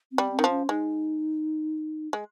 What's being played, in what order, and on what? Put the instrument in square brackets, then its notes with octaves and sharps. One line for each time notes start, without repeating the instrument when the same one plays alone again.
[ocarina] C4
[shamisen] G3
[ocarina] C4
[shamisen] D#3
F3
[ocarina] C#4
[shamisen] G#3 [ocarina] D#4
[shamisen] G#3